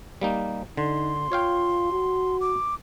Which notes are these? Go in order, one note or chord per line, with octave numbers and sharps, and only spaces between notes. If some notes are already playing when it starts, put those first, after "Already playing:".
G3 A#3 D#4
D3 D#4 C6
F4 C#5 F5 G5
F#4
D6